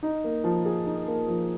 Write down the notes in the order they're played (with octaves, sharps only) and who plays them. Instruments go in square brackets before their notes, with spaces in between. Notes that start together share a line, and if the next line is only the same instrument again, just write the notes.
[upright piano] D#4
A#3
F3
G#4
D#4
A#3
F3